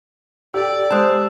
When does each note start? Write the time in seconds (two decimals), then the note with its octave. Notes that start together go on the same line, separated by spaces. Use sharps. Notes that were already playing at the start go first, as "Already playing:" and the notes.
0.54 G4 A4 D5 G5 E6
0.90 G#3 C5 A5 D#6 F#6 G6